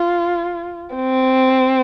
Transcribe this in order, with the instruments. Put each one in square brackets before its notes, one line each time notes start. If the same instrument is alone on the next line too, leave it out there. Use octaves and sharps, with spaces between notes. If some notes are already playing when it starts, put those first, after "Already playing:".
Already playing: [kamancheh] F4
C4